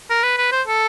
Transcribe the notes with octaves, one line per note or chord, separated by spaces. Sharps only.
A#4
B4
B4
C5
A4